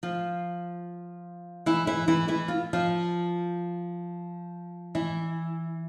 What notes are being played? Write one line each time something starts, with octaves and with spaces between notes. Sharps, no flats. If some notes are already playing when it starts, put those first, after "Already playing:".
F3 F4
E3 E4
E3 E4
E3 E4
E3 E4
F4
F3 F4
E3 E4